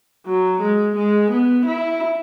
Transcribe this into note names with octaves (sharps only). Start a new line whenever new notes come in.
F#3
G#3
G#3
B3
E4